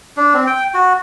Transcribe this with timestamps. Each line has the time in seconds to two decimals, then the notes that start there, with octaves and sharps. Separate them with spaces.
0.17 D4
0.34 C4
0.47 G5
0.74 F#4